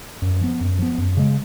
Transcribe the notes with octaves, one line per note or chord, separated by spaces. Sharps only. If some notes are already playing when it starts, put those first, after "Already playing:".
F#2
F3 B3
F#2
F3 B3
F#2
C#3 G#3